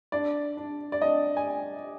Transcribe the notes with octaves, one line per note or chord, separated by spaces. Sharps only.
D4 D5
D4
D5
D4 D#5
G#5